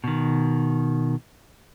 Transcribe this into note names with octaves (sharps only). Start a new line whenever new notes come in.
B2 D#3